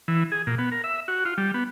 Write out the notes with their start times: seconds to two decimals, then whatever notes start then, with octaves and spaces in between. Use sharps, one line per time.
0.08 E3
0.32 G#4
0.47 A#2
0.58 B3
0.72 A#4
0.84 E5
1.08 F#4
1.25 F4
1.38 G3
1.54 B3